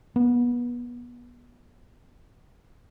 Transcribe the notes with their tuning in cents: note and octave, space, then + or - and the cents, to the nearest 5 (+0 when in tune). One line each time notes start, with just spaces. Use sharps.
B3 -25